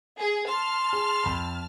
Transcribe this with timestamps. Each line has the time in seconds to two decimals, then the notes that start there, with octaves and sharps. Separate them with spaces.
0.16 G#4
0.48 A5 C6 F6
0.93 G#4
1.24 F2 B5